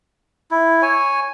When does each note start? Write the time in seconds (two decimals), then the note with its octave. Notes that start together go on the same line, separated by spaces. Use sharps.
0.51 E4
0.82 C#5 G#5